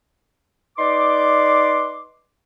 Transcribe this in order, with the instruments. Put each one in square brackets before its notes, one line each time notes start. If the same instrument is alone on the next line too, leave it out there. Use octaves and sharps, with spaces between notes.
[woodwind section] D#4 B4 D5 C6 D6